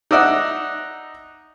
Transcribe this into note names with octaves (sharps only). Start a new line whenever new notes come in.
D#4 D5 E5 F#5